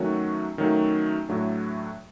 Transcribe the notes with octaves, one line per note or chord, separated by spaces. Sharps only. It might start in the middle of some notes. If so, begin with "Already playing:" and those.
Already playing: D#3 F#3 A3 C#4 F#4
D#3 F#3 A3 C#4 F#4
A2 F#3 A3 D4